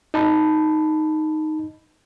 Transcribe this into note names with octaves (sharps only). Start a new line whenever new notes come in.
D#4 A5 B5